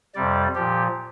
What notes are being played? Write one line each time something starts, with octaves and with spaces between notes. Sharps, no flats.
F2 C3 G3 D5
A#2 F3 G4